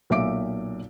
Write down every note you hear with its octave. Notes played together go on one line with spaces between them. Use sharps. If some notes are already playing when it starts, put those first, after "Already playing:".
B1 A#2 E5 D6 D7